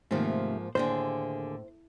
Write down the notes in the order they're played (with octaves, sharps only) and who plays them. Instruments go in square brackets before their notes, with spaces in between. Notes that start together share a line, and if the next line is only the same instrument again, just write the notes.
[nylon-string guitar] G#2 F3 A#3 [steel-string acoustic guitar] C3 D#3 A3
[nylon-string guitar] D#2 D3 G#4 [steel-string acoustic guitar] A2 [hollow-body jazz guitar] C5